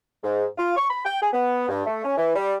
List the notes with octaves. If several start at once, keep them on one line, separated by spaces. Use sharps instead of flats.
G#2
F4
C#6
B5
G5
G#4
B3
G2
A3
C#4
E3
G3